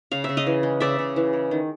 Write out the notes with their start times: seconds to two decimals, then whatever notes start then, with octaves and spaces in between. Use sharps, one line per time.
0.12 C#3 F5
0.24 C#3 E5
0.37 D#5 F5
0.47 E3
0.63 G#3
0.80 C#3 D5 E5
0.99 C#3
1.16 E3
1.33 G#3
1.51 D#3